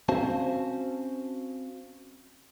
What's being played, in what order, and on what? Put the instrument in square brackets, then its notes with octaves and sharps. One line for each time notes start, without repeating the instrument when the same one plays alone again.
[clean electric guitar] C4 C#4 F#4 C5 F5 A5